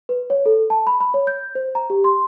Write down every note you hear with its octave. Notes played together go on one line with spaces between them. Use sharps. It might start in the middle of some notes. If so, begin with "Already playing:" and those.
B4
C#5
A4
A5
B5
B5
C#5
G6
C5
A#5
G4
C6